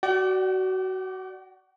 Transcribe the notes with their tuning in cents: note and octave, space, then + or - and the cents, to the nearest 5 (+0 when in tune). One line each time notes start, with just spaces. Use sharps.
F#4 +20 D5 +0 G5 -40